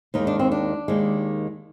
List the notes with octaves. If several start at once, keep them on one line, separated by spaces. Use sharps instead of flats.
D#2 D#3 G#3 D#4
D4
C4
D4
D#2 D#3 G#3